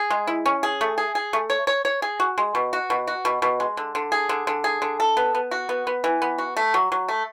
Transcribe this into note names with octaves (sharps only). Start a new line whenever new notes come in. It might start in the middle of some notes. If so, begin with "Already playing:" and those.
Already playing: G#4
G#3
E4
C#4
G#4
A3
G#4
G#4
A3
C#5
C#5
C#5
G#4
F#4
G#3
B2
F#4
B2
F#4
B2
B2
G#3
D3
D3
G#4
D3
D3
G#4
D3
A4
B3
B3
F#4
B3
B3
E3
B3
F#4
A3
F#3
F#3
A3